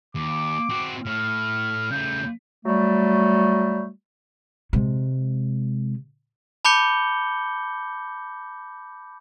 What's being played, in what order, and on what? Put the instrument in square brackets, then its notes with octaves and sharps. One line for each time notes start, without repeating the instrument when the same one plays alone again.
[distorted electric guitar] D#2 [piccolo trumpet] D6
[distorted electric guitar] C4 F#4
[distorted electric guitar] A2 [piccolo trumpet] F6
[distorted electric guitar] C#3 A3 [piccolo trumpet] G6
[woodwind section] F#3 G3 A3
[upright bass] C3 G#3
[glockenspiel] A5 B5 D6 G6 C#7 G7